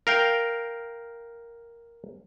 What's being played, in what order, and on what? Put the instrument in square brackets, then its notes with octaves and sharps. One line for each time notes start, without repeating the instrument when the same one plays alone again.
[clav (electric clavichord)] A#4 F5 G5